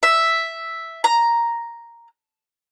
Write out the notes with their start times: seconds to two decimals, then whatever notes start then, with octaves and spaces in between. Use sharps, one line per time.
0.03 E5
1.04 A#5